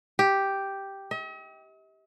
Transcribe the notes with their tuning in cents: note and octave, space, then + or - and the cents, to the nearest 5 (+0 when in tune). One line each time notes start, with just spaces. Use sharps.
G4 +0
D#5 +45